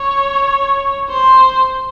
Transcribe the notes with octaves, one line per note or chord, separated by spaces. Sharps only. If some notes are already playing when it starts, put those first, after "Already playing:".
Already playing: C#5
C5